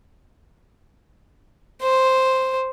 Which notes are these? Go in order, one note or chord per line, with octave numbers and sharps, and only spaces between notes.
C5